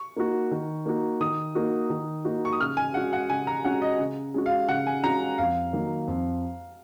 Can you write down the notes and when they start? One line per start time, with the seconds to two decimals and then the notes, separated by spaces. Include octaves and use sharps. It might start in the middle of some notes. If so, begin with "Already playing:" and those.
Already playing: C#6
0.17 A#3 D#4 F#4
0.51 D#3
0.86 A#3 D#4 F#4
1.21 D#3 D#6
1.55 A#3 D#4 F#4
1.90 D#3
2.25 A#3 D#4 F#4
2.45 C#6
2.53 D#6
2.60 C#3 F6
2.77 G#5
2.94 G#3 C#4 F#4 F#5
3.13 F#5
3.30 C#3 G#5
3.47 A#5
3.64 G#3 C#4 F#4 F#5
3.82 D#5
3.99 C#3
4.34 G#3 C#4 F#4
4.46 F5
4.68 C#3 F#5
4.87 G#5
5.03 G#3 C#4 F#4 A#5
5.38 F2 F5
5.73 D#3 F#3 A#3
6.08 F2